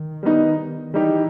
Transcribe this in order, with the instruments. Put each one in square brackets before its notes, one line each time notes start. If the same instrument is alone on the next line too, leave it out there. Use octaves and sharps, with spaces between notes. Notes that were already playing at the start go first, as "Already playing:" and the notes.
Already playing: [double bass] D#3
[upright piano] G3 B3 D#4
[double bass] E3 [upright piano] G3 D#4 G4